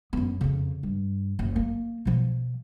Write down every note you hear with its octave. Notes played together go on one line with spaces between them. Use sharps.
F#2 B3
F2 C#3
G2
F#1
A#3
B2 F3